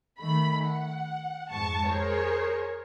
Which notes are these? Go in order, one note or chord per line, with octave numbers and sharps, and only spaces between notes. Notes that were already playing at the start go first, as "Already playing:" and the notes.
D#3 A3 B5
F#5
F2 G#2 G#3 A5 C#6
G#4 A#4 C5 C#5